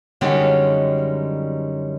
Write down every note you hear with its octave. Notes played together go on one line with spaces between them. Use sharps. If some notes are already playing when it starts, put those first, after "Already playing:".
F#2 D3 G3 G#3 C#4 D#4